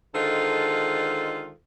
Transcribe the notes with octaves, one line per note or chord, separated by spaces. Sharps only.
D3 D#3 G#3 F4 A4 C5